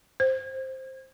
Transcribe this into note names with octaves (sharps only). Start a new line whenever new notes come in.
C5